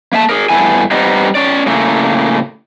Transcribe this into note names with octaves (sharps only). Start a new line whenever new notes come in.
A#3 E5 G#5 A5
G#4 A#4
G2 A3 B3 E4 G#5
G3 B3 C4 D#4
C#4 D5
A2 C#3 A3 A#3